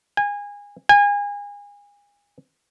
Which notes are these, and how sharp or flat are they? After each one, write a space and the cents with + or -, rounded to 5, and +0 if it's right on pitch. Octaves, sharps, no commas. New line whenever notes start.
G#5 -25
G#5 -30